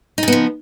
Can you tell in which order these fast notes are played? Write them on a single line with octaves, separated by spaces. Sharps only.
D#4 C#3 B3 F3